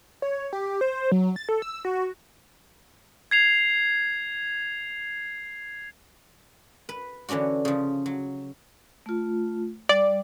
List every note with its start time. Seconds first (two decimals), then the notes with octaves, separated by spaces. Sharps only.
0.22 C#5
0.53 G4
0.81 C5
1.12 F#3
1.36 A6
1.49 A4
1.62 E6
1.85 F#4
3.31 G#6 C7 F7
6.89 B4
7.29 D3 E3 C#4 D4 F#4
7.65 C#3 F3
8.06 F#3
9.06 A3 F4
9.89 G3 D5